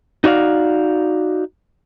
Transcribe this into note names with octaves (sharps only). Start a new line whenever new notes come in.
D#4 F#4 D5 F5